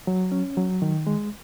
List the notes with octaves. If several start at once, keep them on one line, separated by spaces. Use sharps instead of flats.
F#3
C#4
F#3
D#3
G#3